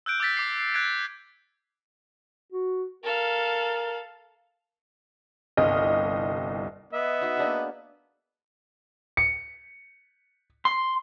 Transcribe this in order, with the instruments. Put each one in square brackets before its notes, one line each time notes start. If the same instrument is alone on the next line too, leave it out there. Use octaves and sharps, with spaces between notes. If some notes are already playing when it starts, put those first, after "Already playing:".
[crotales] E6 F#6 G6 D7
D6 E6 A6 B6
D6 C7
C7
F#6 G#6 A6 D7
[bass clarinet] F#4
[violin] A4 F5 [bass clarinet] A#4
[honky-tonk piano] G1 C2 D#5 F6
[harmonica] B3 [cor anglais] D#5 [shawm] E5
[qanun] D#4 F#4
A#3 D4 G#4
[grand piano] C#7
[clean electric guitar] C6